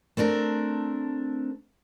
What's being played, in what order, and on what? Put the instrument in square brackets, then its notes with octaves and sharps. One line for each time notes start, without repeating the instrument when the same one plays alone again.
[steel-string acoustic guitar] A3 C4 D4 A#4